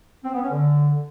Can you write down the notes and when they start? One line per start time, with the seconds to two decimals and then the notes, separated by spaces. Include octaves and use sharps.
0.23 C4
0.33 B3
0.42 C#4
0.51 D3